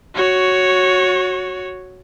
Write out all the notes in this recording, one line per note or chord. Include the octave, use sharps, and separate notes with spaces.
F#4 C#5